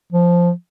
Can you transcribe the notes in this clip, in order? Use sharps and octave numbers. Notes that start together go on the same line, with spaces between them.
F3